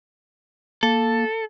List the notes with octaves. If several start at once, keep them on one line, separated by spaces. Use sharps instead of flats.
A#3 A4